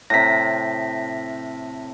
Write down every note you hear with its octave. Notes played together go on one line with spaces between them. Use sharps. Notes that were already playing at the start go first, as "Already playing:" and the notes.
A2 C3 A#6 B6